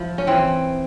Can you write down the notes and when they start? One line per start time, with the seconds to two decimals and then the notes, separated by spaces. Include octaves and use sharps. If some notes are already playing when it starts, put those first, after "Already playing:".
Already playing: F3 E4
0.18 C#4
0.27 E3 C4